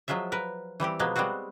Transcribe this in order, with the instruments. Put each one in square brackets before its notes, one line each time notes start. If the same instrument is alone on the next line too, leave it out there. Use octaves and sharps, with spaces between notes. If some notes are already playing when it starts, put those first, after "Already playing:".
[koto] F3 F#3 G#3 F4 E5
A#4 B4
E3 G3 C4 G4
B2 F3 F#3 G#3 A#3 B3
G3 G#3 B3 C4 F#4